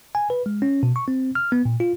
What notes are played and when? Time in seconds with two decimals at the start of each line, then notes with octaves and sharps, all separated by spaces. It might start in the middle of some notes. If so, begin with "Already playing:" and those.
0.15 G#5
0.30 B4
0.46 G#3
0.62 C#4
0.83 B2
0.96 C#6
1.08 C4
1.35 F6
1.52 B3
1.65 A#2
1.80 F4